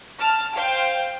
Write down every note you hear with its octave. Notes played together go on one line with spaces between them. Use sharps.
A5 F6
C5 F5 G5